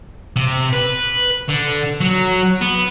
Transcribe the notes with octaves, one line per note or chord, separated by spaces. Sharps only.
C3
B4
D3
F#3
B3